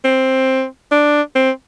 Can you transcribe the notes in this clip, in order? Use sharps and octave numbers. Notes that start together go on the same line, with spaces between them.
C4
D4
C4